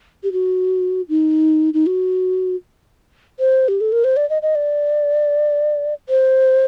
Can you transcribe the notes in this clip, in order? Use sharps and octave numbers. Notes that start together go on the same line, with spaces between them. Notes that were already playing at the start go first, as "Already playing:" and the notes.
G4
F#4
D#4
D#4
F#4
C5
G4
A4
A#4
C5
D5
D#5
D#5
D5
C5